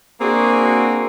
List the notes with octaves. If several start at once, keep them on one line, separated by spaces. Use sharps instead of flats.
A#3 C4 D4 F#4 G#4